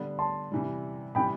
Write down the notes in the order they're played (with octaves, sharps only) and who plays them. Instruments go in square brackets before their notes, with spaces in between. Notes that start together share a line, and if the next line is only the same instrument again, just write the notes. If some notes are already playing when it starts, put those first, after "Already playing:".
Already playing: [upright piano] D3 G3 B3
[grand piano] A5 C6
[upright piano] C3 E3 G3
[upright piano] C3 E3 G3 B3 [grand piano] G5 B5